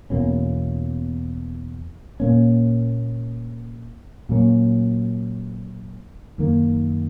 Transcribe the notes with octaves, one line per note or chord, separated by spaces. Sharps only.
E2 B2 A#3 C#4
A#2 A#3 C#4
A#2 F#3 A#3 C#4
F#2 D#3 A#3